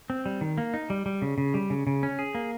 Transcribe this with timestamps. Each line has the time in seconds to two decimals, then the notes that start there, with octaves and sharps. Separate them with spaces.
0.10 C4
0.26 G3
0.41 D#3
0.58 A#3
0.74 D#4
0.90 G3
1.06 G3
1.22 C#3
1.38 C#3
1.54 G3
1.70 C#3
1.87 C#3
2.03 C#4
2.19 G#4
2.35 A#3